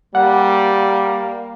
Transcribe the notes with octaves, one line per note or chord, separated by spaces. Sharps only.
G3 A#3 F#5